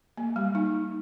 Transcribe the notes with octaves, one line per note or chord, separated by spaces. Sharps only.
A#3
G3
D#4